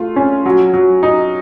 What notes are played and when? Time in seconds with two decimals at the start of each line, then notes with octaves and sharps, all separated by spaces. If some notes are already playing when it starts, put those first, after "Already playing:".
Already playing: A3 F4
0.16 C#4
0.46 F#3
0.74 F#3
1.03 D#4